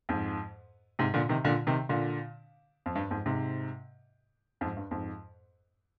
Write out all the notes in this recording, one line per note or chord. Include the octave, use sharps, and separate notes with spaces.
F2 G#2
G#2 C3
A#2 D3
C3 D#3
A#2 D3
C3 D#3
A#2 D3
F2
G2
F2 G#2
G#2 C3
F2 G#2
G2
F2 G#2